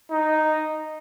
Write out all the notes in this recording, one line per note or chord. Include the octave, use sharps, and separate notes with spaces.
D#4